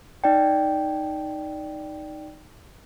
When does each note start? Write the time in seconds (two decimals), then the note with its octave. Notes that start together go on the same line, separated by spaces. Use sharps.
0.24 D#4 D5 G5